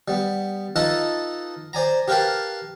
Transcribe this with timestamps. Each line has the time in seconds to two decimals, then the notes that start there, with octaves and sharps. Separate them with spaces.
0.08 G3 B3
0.76 D#4 F4 A4 B4 D#5 A5
1.73 C5 D5 G#5 A#5
2.08 G4 A#4 B4 F5 G5 A5